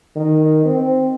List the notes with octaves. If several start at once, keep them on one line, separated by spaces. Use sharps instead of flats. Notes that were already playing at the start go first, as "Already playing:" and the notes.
D#3
C4